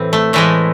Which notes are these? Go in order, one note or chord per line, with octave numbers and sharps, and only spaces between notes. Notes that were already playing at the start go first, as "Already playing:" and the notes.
Already playing: A2 E3 C4
A3
A2 E3 G#3 A3